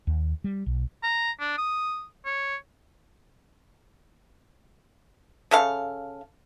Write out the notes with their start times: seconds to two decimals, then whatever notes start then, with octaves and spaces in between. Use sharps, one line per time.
0.07 D#2
0.44 G3
0.66 B1
1.03 A#5
1.40 D4
1.58 D#6
2.26 C#5
5.51 C#3 A4 F5